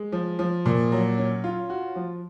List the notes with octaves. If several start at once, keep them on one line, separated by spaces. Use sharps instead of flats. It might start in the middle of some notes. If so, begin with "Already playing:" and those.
Already playing: G#3
F3
F3
A#2
F#3
C#4
F4
F#4
F3